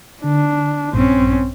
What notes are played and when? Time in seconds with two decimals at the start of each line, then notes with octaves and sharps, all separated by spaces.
0.24 D3 D4
0.94 A#1 G2 C4 C#4